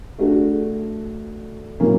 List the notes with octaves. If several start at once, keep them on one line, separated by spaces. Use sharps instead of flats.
A3 D4 F#4 A4
A2 F#3 A#3 C#4